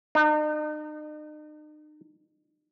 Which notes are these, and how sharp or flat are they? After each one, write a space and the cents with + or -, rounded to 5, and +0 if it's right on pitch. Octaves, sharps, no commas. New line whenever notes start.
D#4 -40